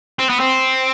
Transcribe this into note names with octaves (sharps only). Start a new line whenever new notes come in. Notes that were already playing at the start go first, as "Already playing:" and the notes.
C4
B3
C4